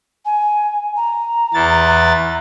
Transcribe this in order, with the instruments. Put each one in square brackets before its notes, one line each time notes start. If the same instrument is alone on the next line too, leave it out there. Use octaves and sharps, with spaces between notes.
[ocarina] G#5
A#5
[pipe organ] E2 E3 A6